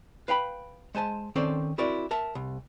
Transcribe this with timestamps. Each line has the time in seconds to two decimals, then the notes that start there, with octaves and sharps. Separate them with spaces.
0.28 B4 F5 G5 B5
0.95 G#3 C5 G#5 A5
1.36 D#3 C4 C#4 A4 C5 D5
1.78 C4 E4 F#4 A#4 D5
2.11 A#4 E5 A5
2.35 C2